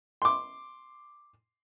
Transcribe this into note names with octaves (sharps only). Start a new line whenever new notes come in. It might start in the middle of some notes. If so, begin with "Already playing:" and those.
C6 D6